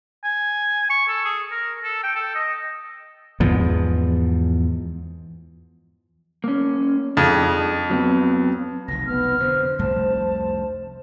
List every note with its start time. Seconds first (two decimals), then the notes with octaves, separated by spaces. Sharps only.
0.24 G#5
0.90 C#6
1.08 A4
1.25 G#4
1.51 A#4
1.84 A4
2.03 G5
2.16 A4
2.35 D#5
3.40 E2 G#2 F3
6.44 A#3 C#4
7.17 F2 D4 D#4 G#4
7.90 F#3 B3 C4
8.88 F1 B1 D#3 A#6
9.07 B3 F6
9.40 F2 D3 C5
9.79 C2 F2 A3 A5